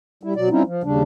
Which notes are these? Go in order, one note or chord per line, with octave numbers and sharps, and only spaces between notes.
G3 E4
B2 F#3 D5
F3 G3 C4 C#4 D#4 E4
F3
D#2 C#3 G3 D4